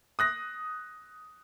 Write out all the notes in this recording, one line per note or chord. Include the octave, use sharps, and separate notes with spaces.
D#6 F#6 A#6